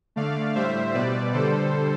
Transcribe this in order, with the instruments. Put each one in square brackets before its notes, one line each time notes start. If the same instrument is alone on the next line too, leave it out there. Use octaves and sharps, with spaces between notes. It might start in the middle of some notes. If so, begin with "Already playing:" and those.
[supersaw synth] D3 A3 D5 F5
A2 G3 C5 E5
B2 G3 B4 D5
D3 G3 A4 C5